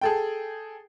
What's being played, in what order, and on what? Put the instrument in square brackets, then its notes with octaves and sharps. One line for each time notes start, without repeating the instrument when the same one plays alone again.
[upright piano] G#4 A4 G5